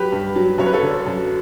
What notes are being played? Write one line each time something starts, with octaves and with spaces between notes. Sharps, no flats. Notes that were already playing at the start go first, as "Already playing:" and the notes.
Already playing: F#3 G4 B4
G2
F#3
F#2 C#5
B4
A4 C#5
D3
F#2